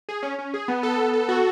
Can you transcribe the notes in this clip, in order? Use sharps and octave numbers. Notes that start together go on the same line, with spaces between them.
G#4
C#4
C#4
G#4
B3
A4
B3
A4
F#4